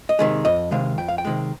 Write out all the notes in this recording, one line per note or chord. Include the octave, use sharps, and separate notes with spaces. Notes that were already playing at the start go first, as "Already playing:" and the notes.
D#5
C3 D#3 G#3
F2 D#5
C3 D#3 G#3 F5
F2 G5
F5
G5
C3 D#3 G#3